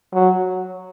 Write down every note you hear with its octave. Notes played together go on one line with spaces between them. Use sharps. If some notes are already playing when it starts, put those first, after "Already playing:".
F#3